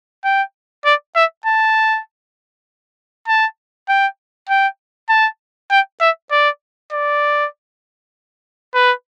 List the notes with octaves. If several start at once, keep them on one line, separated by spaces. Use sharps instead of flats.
G5
D5
E5
A5
A5
G5
G5
A5
G5
E5
D5
D5
B4